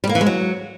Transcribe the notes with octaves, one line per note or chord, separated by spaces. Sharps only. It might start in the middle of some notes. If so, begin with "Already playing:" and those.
G3
A#3
E3
G#3
F#3